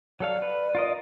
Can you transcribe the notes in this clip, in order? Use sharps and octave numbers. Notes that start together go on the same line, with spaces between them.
F#3 A4 D5 F5
B4
F4 A#4 D#5